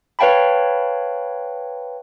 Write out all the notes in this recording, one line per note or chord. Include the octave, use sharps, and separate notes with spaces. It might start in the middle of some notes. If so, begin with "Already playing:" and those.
B4 C#5 F5 G5 A5 B5